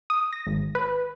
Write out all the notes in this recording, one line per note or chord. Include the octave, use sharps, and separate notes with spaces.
D#6
A#6
G#1
B4